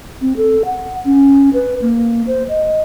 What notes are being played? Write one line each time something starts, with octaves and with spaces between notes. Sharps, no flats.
C4
A4
F#5
C#4
B4
A#3
C5
D#5